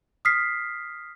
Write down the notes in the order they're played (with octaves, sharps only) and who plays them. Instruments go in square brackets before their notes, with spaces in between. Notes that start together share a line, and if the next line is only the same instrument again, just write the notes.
[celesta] D#6 F6 B6 C7